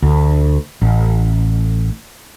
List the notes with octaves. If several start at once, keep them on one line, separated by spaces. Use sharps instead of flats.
D2
A1